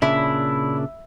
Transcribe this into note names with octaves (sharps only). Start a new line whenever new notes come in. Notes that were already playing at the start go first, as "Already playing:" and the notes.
A#2 C#3 D4 E4